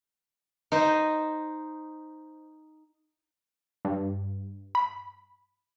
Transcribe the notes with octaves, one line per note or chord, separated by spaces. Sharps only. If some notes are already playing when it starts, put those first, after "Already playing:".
D#4 C5 D#5
G2
B5